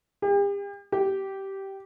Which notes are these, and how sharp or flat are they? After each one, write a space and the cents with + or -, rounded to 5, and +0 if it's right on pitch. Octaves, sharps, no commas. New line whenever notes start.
G4 +40
G4 -15